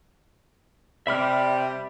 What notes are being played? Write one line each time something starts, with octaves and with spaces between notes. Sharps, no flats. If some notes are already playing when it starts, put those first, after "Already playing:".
C3 G3 E5 B5 F6